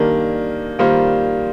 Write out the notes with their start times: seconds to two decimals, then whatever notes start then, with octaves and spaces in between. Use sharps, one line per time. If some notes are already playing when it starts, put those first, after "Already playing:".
Already playing: D#3 G3 A#3 D4
0.79 D#3 G3 A#3 F4 C5